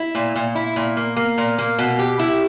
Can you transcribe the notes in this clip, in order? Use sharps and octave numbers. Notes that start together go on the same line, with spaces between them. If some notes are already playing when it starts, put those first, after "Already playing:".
Already playing: E4
A#2
A#2
E4
A#2
A#3
A#3
A#2
A#3
B2
G4
E4